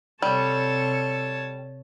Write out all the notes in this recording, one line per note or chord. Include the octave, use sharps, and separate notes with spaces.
C3 G3 A4 C#5 A5